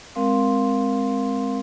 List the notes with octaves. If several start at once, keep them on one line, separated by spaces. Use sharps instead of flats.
G#3 C4 A#4 F5 C6